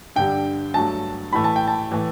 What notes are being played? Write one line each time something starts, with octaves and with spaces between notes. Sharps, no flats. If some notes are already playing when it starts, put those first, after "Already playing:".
G2 D3 G3 G5
G2 F#3 A3 A5
A2 E3 A3 B5
A5
G5
A5
A2 E3 A3